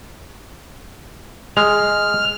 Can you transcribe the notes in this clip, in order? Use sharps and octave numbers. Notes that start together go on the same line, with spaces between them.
G#3 F6